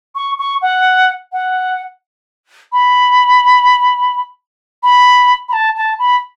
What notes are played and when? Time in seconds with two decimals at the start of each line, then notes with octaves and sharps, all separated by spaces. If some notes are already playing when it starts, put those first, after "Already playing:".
0.15 C#6
0.39 C#6
0.62 F#5
1.32 F#5
2.72 B5
4.83 B5
5.49 B5
5.53 A5
5.76 A5
5.99 B5